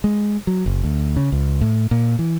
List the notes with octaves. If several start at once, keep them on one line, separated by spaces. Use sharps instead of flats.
G#3
F#3
F#1
D2
C#3
C#2
A2
A#2
E3